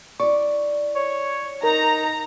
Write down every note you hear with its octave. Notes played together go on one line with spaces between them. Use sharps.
E4 D5 C#6
C#5
D#4 A#4 A#5